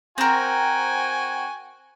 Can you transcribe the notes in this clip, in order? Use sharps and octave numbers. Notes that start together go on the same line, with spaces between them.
C4 F#4 A#4 G5 G#5